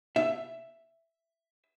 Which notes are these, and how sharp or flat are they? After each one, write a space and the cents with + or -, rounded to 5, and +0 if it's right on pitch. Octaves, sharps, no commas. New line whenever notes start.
E5 +5